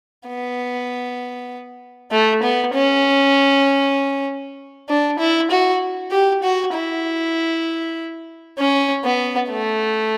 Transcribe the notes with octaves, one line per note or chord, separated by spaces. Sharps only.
B3
A3
B3
C#4
D4
E4
F#4
G4
F#4
E4
C#4
B3
A3